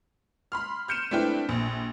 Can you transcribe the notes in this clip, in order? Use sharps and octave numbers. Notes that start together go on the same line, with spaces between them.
B5 C6 F6
F6 G6 C#7 D#7 E7
A3 C4 D4 E4 B4 G5
A#1